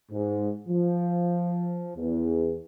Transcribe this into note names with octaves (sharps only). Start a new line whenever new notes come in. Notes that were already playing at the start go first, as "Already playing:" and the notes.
G#2
F3
E2